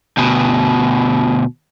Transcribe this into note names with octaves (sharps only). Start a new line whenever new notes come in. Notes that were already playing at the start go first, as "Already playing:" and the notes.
D2 B2